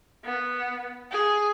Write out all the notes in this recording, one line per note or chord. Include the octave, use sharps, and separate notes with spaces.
B3
G#4